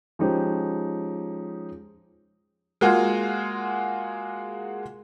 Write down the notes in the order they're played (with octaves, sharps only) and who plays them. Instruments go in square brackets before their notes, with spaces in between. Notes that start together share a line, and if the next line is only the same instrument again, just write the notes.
[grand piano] F3 G#3 C#4 D#4 G4 C5
[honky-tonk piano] G#3 A#3 F4 F#4 G#4